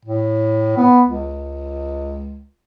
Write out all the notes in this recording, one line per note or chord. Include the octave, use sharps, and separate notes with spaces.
A2
B3
C#2